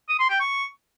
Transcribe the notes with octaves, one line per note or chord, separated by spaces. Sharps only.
D#6
C6
G5
C#6